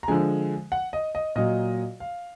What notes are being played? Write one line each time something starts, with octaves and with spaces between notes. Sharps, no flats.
A#5
D3 F3 G#3 G#5
F#5
D#5
D#5
A#2 F#3 D#5
F5